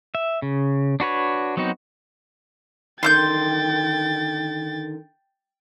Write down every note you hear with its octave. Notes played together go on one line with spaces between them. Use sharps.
E5
C#3
D4 F#4 B4 C#5
F#3 B3 C4 D#4 F#4
D3 D#3 G5 C6 D6 G6 A6